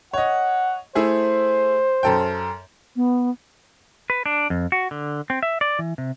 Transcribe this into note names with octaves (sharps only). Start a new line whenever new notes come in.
C#5 D#5 F#5
A3 E4 G#4 C5
F#2 A4 G5
B3
B4
D4
F2
F#4
D3
C4
E5
D5
E3
C3